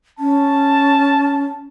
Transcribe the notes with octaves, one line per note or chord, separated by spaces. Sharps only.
C#4 A5